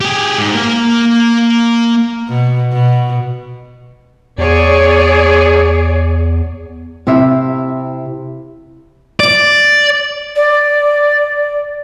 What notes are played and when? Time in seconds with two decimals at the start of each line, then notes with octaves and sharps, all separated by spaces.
0.01 G4 G#4
0.38 G#2
0.54 A#3 F5
2.29 B2
2.73 B2
4.38 E2 G#4 C#5 D5
7.07 C3 E4 E5 F5
9.20 D5
10.36 D5